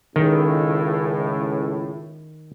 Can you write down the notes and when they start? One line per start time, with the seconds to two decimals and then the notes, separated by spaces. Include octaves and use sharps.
0.16 C#2 A2 D#3